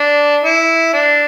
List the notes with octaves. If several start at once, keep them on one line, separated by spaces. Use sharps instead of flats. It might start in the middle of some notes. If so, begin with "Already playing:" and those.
Already playing: D4
E4
D4